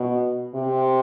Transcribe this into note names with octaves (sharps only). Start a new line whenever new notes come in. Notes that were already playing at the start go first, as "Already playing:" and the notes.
Already playing: B2
C3